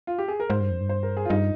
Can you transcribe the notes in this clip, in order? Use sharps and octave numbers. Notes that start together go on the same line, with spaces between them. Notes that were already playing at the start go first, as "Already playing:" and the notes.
F4
G4
G#4
A#4
G#2 C5
G2
F2
G2
C5
A#4
G#4
F4
G2 D#4